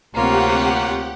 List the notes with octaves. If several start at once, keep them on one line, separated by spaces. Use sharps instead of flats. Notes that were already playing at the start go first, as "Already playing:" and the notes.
D2 C3 A#3 C4 F4 G4 C#5 F#5